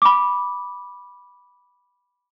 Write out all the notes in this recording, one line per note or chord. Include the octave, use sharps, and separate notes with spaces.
B5 D6